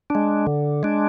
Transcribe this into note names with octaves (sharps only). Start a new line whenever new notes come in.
G#3 D4
D3
G#3 D4